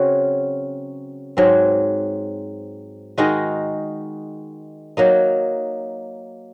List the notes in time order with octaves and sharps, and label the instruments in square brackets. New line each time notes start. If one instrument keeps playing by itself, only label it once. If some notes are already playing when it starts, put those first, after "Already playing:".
Already playing: [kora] C#3 F#3 C4 F#4
G#2 F#3 C4
D#3 G#3 D#4 F#4
F#3 A#3 D#4